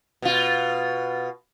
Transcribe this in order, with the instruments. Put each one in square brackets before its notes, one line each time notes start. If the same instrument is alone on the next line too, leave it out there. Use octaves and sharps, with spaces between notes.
[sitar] B2 F4